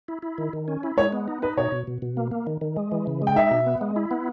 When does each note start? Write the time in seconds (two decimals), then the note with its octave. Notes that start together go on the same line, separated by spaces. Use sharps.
0.08 E4
0.22 E4
0.38 D#3
0.53 D#3
0.68 C#4
0.83 E4
0.97 G#3 C#5
1.12 B3
1.28 D#4
1.42 D#4 B4
1.57 B2 C#5
1.72 B2
1.87 B2
2.02 B2
2.17 A#3
2.31 A#3
2.47 D#3
2.61 D#3
2.76 G#3
2.92 E3
3.07 C#3
3.22 G#3
3.27 G5
3.36 D#4 E5
3.51 B2
3.67 B3
3.81 G#3
3.96 E4
4.11 B3